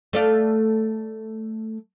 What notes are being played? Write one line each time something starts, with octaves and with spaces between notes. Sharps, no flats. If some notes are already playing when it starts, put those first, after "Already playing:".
A3 D5 F5